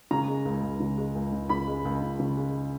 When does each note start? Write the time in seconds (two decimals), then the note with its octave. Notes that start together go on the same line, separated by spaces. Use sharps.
0.11 C#3 A#5
0.28 G#3
0.45 C#2
0.63 C#2
0.80 C#3
0.98 G#3
1.15 C#2
1.32 C#2
1.49 C#3 B5
1.67 G#3
1.85 C#2
2.02 C#2
2.20 C#3
2.37 G#3